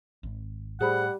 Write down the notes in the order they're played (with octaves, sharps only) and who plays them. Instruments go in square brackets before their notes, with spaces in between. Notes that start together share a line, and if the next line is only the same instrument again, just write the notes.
[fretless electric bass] G#1
[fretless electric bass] A2 [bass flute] G3 [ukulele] G#4 C5 B5 [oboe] F#5